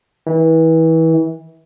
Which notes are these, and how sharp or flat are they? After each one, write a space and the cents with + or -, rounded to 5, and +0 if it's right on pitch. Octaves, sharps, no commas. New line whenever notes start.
E3 -30